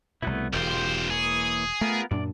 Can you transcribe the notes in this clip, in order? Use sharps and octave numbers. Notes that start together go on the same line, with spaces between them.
C2 B2 A3 B3 E4
E1 B1 F4 G4 C5 G5
E3 A#3 G#4 C#5
A3 B3 F4 A#4
F#2 A#2 D4 D5